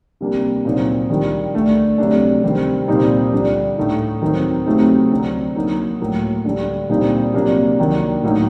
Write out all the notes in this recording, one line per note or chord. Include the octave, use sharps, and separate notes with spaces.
C3 G3 A#3 D4
A#2 F#3 C4 D#4
D#3 G3 D4
D3 A3 D4
C3 F#3 A3 D4
C3 D#3 G3 C4
A#2 G3 C4 D#4
D3 G3 D4
A2 A3 D#4
D#3 F#3 C4 D#4
C3 F#3 A3 C4 D#4
D3 F#3 C4
F#3 A#3 D#4
A2 F#3 A#3
D3 G3 D4
A#2 G3 C4 D#4
C3 F#3 A#3 D4
D#3 F#3 A#3 D4
A2 F#3 A#3 D#4